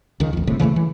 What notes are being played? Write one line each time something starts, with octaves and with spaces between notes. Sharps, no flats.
C#2 D#3
A1 F2
F#1 C2 A2 C3
C#3 E3 G3 A3
E3